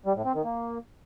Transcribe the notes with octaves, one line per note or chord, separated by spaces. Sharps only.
G3
A2
C4
D#3
A#3